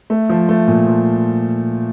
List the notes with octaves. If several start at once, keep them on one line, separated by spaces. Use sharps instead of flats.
A3
F3
A3
A#2
F3